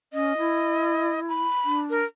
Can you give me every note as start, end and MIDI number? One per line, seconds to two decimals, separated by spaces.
0.13 0.33 61
0.13 1.20 75
0.38 1.39 64
1.29 1.79 83
1.65 2.02 62
1.90 2.05 70